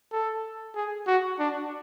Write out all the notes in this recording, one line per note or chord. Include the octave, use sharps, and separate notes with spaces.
A4
G#4
F#4
D4